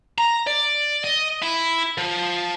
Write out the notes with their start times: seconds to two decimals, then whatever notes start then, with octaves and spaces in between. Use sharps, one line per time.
0.18 A#5
0.47 D5
1.04 D#5
1.42 E4
1.98 F3